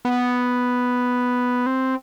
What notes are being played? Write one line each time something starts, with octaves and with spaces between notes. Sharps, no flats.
B3
C4